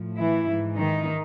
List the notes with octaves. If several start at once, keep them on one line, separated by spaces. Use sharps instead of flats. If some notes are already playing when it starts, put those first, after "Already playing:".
Already playing: A2 F3
E3 E4
G#2 E3
D#3 D#4